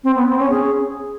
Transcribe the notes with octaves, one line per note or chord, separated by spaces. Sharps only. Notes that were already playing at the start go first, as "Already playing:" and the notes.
C4
B3
C4
C#4
G#4